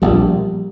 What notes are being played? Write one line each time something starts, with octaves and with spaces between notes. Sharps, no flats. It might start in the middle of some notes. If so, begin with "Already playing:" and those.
A#1 A#2 G3